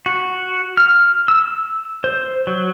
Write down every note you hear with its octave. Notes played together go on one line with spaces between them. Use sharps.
F#4
F6
E6
C5
F#3